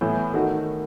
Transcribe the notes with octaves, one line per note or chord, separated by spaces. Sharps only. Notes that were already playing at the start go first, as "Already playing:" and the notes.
A2 E3 B3 E4
D#3 A3 F#4